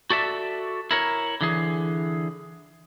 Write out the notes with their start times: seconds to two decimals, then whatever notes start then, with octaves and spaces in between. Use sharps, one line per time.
0.10 F#4 A4 D5 E5
0.91 E4 A#4 C#5
1.41 D3 E3 G#4